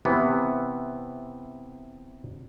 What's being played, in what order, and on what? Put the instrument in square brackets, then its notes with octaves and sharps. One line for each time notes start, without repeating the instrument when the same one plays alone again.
[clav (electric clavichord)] C3 E3 B3